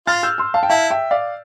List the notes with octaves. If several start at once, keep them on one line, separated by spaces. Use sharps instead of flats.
F4 F6 A6
E6 G6
C6 E6
F5 A5
G5
E4 F5 A5
E5 G5
D5 F5